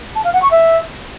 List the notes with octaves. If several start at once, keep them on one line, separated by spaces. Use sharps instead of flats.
A5
F5
F#5
C#6
E5